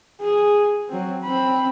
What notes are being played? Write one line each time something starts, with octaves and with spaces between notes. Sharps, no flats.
G#4
F#3 C4
C4 B5